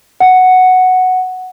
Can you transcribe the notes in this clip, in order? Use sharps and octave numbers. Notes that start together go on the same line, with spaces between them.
F#5